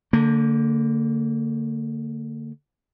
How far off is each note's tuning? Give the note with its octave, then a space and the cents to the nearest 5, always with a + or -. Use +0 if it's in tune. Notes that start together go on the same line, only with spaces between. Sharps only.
D3 -15 A#3 -40